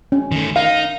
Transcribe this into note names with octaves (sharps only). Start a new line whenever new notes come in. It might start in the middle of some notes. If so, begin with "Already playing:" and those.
C#4
D#3 A3
D#4 F5